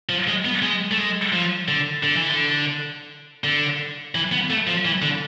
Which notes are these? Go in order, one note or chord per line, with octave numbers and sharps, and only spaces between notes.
F3
G#3
B3
G#3
A3
G#3
F3
D3
D3
E3
D3
D3
E3
B3
A3
F3
E3
D3